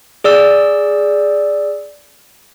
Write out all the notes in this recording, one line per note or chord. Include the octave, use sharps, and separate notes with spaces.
G#4 D5 E6